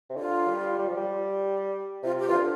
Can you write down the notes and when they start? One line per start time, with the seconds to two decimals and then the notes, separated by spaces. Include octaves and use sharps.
0.09 C3
0.17 D3 F4
0.48 G3
0.79 G3
0.88 F3
0.97 G3
2.03 C3 F4
2.18 G4
2.27 F4
2.30 E3
2.34 D3